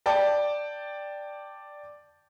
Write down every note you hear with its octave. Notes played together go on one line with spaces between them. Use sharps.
D5 G5 A5